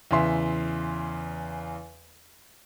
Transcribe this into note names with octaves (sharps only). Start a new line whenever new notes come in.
E2 C#3 E5 C6